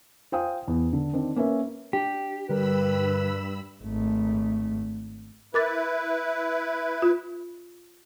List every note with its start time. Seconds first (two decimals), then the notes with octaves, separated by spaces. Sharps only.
0.32 F4 C5 F5 G5 G#5 D#6
0.68 E2
0.93 D3
1.13 D#3 C4 D4
1.36 A#3 C#4 B4 E5
1.93 D4 G4
2.49 G2 D3 G3 A#4 B4 B5 E6
3.83 G#1 A3
5.54 E4 A#4 B4 D6 A6
7.02 F4